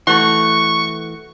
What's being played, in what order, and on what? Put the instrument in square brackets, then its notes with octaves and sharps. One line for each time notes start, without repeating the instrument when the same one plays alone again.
[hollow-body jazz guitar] E3 A3 [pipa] F#4 [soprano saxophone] C#6